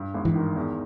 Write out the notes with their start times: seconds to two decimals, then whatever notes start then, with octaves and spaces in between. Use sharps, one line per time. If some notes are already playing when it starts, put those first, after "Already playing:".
Already playing: G2
0.14 G#1
0.25 E3
0.35 D#3
0.56 E2